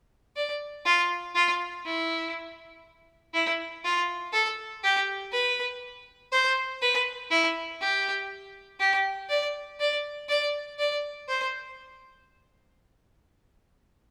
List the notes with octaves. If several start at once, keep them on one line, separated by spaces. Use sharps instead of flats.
D5
F4
F4
E4
E4
F4
A4
G4
B4
C5
B4
E4
G4
G4
D5
D5
D5
D5
C5